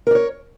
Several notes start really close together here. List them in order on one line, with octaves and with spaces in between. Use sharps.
A#4 D5 C#5